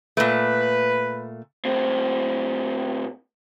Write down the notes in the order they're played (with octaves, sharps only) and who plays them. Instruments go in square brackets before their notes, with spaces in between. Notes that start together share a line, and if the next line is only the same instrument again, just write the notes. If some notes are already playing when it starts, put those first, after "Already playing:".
[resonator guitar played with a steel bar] A#2 A3 [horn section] B4
[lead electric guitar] A2 C4